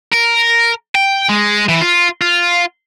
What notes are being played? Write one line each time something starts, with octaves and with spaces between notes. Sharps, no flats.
A#4
G5
G#3
E3
F4
F4